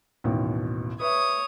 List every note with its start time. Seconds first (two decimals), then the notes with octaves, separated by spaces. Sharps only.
0.24 A1 D#2 B2
1.00 B4 C#5 E5 D#6